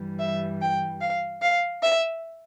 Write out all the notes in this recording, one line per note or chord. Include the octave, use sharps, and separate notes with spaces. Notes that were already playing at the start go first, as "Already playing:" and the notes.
Already playing: G2 E3 G3
E5
G5
F5
F5
E5